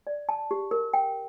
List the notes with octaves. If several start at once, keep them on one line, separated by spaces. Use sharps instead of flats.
D5
A5
G4
A#4
G5